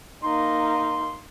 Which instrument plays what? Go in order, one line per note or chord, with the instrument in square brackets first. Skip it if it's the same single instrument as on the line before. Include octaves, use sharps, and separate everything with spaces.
[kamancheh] A#3 D#4 [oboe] C6